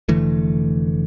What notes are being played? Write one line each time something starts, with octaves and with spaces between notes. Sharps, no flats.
F1 D3 E3 A3